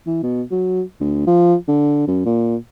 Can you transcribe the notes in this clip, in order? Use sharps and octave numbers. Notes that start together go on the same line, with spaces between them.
E3
B2
F#3
D2
F3
D3
F#2
A#2